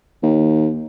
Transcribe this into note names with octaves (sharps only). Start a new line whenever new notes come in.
D#2